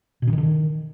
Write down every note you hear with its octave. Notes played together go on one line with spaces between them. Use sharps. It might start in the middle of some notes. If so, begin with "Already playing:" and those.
B2
C#3
D#3
D3
D#3